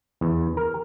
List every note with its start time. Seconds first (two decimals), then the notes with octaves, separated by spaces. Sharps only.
0.21 E2
0.57 A#4